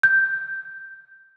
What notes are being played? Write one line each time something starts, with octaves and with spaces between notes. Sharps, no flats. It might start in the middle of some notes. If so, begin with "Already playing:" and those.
G6